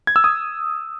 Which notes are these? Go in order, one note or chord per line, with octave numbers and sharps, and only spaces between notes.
G#6
E6
D#6